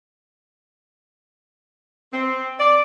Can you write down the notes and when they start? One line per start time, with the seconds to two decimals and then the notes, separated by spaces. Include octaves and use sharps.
2.13 C4
2.60 D5